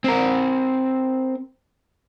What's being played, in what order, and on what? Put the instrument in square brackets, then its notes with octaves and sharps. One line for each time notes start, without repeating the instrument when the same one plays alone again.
[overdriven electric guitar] C4 A#4